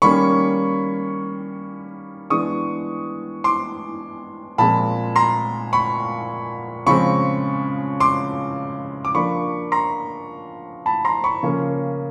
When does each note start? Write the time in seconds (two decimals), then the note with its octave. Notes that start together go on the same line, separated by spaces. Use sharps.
0.02 D#3 G3 A#3 C#4 B5 C#6
2.30 E3 G#3 B3 D4 C#6 D#6
3.44 C6 D6
4.58 A#2 F3 G#3 C4 A5 B5
5.16 A#5 C6
5.73 B5 C#6
6.86 C#3 F3 G#3 C4 B5 C#6
8.00 C6 D6
9.05 D6
9.15 F3 A#3 D4 B5 C#6
9.72 A#5 C6
10.86 A5 B5
11.05 A#5 C6
11.24 B5 C#6
11.43 C#3 F3 A#3 C#4